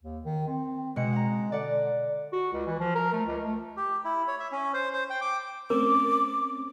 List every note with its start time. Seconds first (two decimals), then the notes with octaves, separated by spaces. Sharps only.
0.03 D#2
0.25 D#3
0.48 C4
0.96 B2 G#3 F#5 C#7
1.13 F#5 A#5
1.52 D3 D5 F#5
2.33 F#4
2.53 C#2
2.67 E3
2.79 F3
2.95 A#4
3.13 A3
3.26 C#2
3.43 A3
3.77 G4
4.05 E4
4.27 C#5
4.40 E5
4.52 C#4
4.74 C5
4.93 C5
5.10 G5
5.21 D6
5.70 A3 C4 C#4 A#4 D6